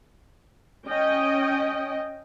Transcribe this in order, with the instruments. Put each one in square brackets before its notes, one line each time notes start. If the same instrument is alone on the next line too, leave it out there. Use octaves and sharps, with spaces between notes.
[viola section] C#4 D#5 G5